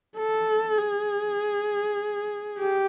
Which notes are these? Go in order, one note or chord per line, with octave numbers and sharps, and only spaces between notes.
A4
G#4
G4